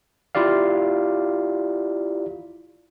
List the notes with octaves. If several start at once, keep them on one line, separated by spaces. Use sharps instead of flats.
E4 F4 G4 D5 F5